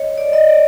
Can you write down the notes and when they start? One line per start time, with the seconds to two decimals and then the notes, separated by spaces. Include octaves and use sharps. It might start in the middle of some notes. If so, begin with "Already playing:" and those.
Already playing: C#5 D#5
0.18 D5
0.33 D#5
0.49 D5